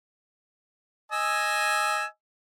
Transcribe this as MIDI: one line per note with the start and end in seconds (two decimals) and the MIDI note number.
1.12 2.05 75
1.12 2.05 80
1.12 2.05 88